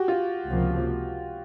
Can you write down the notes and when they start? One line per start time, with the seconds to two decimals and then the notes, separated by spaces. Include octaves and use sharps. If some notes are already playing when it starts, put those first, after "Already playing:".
Already playing: F#4 G4
0.08 F4
0.49 C#2 C3 F3 A#3